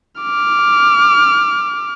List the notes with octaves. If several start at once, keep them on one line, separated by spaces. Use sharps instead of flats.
D6 F6